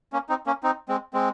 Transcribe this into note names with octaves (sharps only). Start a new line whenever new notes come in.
A#3 C#4
C4 D#4
A#3 C#4
C4 D#4
G#3 C4
G#3 C4